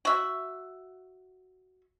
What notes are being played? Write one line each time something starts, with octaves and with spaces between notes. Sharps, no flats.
F#4 E5